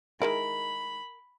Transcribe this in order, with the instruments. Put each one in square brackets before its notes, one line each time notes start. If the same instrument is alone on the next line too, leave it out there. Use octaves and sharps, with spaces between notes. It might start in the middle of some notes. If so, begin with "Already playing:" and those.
[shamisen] D#3 G#3 E4 [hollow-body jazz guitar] A#4 [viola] B5